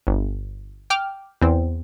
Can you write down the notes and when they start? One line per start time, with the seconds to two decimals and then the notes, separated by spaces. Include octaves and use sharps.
0.07 G1
0.90 G5 D6 F6
1.41 E2 C4